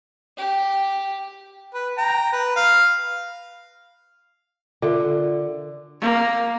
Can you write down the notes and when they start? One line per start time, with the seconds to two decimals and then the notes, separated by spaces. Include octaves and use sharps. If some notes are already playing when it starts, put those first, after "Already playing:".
0.37 G4
1.74 B4
1.98 G5 A#5
2.32 B4
2.56 F5
4.82 D3 F4 A#4 E5
6.01 A#3